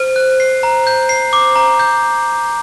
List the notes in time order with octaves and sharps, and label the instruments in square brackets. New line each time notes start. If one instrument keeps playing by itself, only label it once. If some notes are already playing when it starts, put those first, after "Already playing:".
Already playing: [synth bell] C5
[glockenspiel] F#6
C7
A#5
G6
C7
D6
A#5
G6